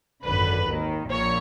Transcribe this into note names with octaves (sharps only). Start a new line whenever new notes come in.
G#1 F#2 D3 B4
D#2 D#3
A#1 A#2 C#5